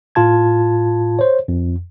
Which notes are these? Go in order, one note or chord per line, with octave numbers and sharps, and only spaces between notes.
A2 F4 A5 G#6
C5 C#5
F2